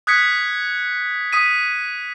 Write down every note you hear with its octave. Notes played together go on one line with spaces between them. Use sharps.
D#6 F#6 G#6 B6 C#7
D#6 B6 D#7